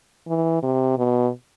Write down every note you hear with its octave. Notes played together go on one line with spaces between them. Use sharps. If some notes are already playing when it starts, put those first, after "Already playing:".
E3
C3
B2